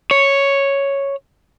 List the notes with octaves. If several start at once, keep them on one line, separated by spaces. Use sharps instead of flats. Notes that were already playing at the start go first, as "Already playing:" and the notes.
C#5